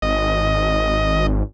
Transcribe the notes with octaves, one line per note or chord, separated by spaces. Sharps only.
G#1 D#5